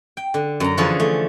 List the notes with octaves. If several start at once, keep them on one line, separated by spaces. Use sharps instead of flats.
G5
D3
F#2 A#5
D3 E3 F3 C#4 G#4 A4
A3